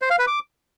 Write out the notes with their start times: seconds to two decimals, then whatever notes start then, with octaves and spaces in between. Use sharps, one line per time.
0.02 C5
0.10 F5
0.19 B4
0.27 D6